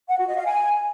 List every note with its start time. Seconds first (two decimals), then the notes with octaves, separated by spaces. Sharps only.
0.09 F#5
0.18 F#4
0.27 D#5
0.37 F5
0.46 G#5